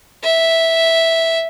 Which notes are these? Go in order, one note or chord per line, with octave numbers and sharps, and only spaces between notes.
E5